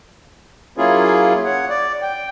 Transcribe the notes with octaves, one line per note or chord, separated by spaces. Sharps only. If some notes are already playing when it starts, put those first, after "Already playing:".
F#3 A#3 C#4 E4 F4 G#4
C#5 F#5
D5
G5